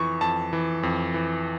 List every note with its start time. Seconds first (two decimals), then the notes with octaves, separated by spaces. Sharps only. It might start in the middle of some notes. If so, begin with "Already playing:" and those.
Already playing: F2 E3 C#6
0.21 F2 A5
0.53 E3
0.83 F2
1.14 E3